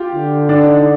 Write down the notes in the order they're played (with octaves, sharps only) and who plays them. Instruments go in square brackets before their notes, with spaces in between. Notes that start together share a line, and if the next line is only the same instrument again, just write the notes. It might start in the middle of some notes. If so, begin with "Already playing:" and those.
Already playing: [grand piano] F4 G4
[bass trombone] D3
[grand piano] D4
D#4